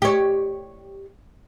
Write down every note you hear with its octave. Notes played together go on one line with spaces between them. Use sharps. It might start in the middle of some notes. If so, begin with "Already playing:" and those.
G4 C#5